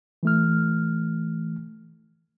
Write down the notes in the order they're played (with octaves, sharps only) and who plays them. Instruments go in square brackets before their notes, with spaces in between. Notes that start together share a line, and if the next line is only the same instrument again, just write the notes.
[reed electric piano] E3 A3 F6